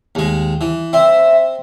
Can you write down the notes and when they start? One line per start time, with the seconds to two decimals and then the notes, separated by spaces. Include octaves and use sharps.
0.15 D#2 G#3
0.61 E3
0.93 C4 E5